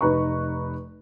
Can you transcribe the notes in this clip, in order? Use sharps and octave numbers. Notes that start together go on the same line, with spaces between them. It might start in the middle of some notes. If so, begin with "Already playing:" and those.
F1 D#4 B4 A#5 C#6